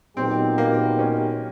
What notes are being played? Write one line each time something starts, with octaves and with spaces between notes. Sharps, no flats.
A#2 F#3 B3 C4 D#4 G4
A#3
C#4